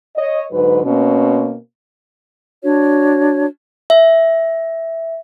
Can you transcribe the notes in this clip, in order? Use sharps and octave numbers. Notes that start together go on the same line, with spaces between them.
C#5 D#5
G#2 D3 F#3 B4
B2 A#3 C4 C#4
D4 F#4 C#5
E5